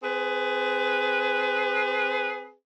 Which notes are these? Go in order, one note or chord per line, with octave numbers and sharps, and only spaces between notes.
C4 G#4 B4